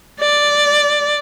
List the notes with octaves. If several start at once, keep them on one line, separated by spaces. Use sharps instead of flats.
D5